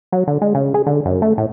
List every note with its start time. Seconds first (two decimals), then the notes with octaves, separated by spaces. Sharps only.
0.12 F#3
0.28 D3
0.42 G#3
0.55 C#3
0.74 G#4
0.87 D3
1.05 F#2
1.22 A3
1.38 A2